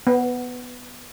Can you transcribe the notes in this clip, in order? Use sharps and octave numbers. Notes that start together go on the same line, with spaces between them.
B3